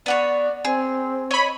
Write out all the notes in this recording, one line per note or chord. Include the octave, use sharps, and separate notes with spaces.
B3 F#4 C#5 D5
C4 G#4
C#5 D#5 B5